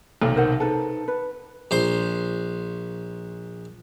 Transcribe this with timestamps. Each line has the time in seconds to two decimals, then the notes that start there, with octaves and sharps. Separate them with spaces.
0.22 B1 C3 D#3 A4
0.36 A#4 C5 F#5
0.60 D#4 A4 B4 C5
1.08 B4
1.71 A#1 C5 C6